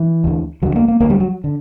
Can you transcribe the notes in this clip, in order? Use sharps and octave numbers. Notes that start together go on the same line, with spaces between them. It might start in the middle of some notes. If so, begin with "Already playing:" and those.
Already playing: E3
D2 D3
D2 D3 F#3
A#3
A#3
D2 D3 A#3
G3
F#3
D3